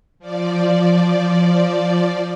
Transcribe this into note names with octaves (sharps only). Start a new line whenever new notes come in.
F3 D5